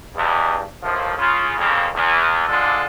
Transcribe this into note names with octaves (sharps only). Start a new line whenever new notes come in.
E2 G2 B2
D#2 A2 F3
C#3 F4
F2 C#3 A#3
E2
D3 F3 G#3 D4 F4 A4